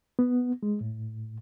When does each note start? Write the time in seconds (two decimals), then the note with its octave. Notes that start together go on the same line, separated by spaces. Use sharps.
0.19 B3
0.63 G#3
0.81 A2